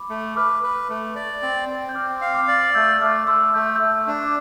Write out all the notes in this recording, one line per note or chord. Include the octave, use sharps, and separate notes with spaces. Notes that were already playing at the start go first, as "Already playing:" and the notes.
Already playing: B5 D6
A3
B4 D6 F6
B4
A3
D5
C4
C4
G6
C4 D6 F6
F5
D6 F6
D5
A3 E6 G6
A3 D6 F6
A3 C6 E6
A3 G6
E6 G6
A3
D4
D6